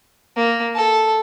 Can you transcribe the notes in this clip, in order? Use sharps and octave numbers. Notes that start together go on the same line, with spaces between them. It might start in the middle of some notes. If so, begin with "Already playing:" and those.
A#3
A4